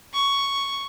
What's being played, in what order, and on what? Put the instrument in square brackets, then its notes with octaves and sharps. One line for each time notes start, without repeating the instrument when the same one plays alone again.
[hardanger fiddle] C#6